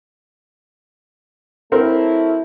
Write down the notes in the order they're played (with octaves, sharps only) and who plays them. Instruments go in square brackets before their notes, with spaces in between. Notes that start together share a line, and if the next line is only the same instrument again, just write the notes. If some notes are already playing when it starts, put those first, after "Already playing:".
[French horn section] F#3 A3 E4 [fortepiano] C4 A#4